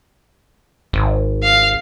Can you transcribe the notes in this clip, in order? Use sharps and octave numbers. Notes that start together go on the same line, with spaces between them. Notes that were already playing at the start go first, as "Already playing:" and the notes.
G#1
F5